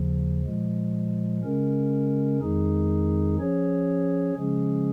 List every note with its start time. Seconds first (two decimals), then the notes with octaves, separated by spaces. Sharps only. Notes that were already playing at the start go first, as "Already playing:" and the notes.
Already playing: D#2 C#3 F3
0.45 A#2 F3 G#3
1.43 C#3 G#3 C#4 A#4
2.40 F2 D#3 G#3 D#4 G#4
3.37 F3 C#4 G#4 C#5
4.35 C#3 F3 G#3 C#4 G#4